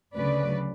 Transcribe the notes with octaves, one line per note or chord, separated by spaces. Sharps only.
D2 C#3 F#3 B4 D5